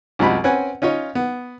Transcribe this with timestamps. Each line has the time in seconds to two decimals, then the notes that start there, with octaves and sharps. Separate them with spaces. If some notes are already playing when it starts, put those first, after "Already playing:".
0.19 C2 F#2 F3 G#3 F#4 B5
0.44 C4 C#4 B4 F#5 G#5
0.82 C#4 D#4 F4 C#5
1.15 B3